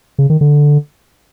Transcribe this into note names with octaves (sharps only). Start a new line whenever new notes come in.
C#3
D#3
D3